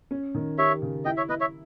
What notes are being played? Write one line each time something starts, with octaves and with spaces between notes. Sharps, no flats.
C#4
D#3
G4 C#5 E5
C#3
E4 D#5 G5
C#5 E5
E4 B4 D#5
C#5 E5